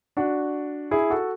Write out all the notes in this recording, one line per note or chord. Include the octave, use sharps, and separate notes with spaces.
D4 F#4
E4 G#4
F#4 A4